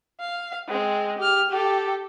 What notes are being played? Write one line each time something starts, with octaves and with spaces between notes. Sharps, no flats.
F5
G#3 C4
G4 F6
G4 A4